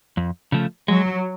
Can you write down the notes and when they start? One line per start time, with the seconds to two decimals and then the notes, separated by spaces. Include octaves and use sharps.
0.17 F2
0.52 C#3 F3 A3
0.88 F#3 G#3